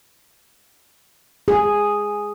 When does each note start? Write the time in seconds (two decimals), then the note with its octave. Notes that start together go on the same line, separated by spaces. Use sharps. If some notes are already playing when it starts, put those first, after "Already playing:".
1.48 G#4